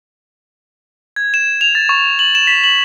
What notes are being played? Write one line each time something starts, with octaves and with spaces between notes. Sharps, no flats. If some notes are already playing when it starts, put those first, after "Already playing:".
G#6
E7
F7
A6
C#6
F#7
E7
B6
F#7